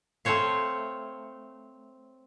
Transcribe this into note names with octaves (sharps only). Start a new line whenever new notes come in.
A3 C4 C5 C#5 F5